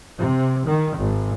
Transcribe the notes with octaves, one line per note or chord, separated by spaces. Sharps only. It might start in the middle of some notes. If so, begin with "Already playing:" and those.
C3
D#3
G#1